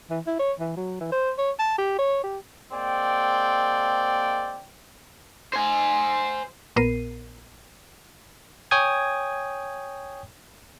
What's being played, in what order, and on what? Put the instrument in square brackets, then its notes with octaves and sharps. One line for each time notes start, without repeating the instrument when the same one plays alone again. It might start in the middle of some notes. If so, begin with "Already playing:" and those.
[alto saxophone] E3
E4
C#5
E3
F#3
E3
C5
C#5
A5
G4
C#5
G4
[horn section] G#3 A#3 C4 D5 G5
[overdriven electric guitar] C5 G#5
[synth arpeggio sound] A#1 A#2 B3 A#4 C7 D#7
[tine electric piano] C#5 G5 G#5 D#6 G#6